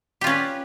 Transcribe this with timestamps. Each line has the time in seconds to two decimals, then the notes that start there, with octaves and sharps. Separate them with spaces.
0.21 G4
0.24 F4
0.27 C#4
0.29 B4